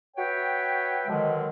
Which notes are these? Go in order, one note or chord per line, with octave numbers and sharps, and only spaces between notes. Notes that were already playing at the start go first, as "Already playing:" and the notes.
F#4 B4 C#5 E5 G5
B2 D3 D#3 F3 F#3 G#3